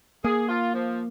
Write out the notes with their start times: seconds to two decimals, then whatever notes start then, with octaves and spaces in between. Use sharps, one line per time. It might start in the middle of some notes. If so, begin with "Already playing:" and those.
0.24 A#3 G#4
0.49 F4
0.74 F3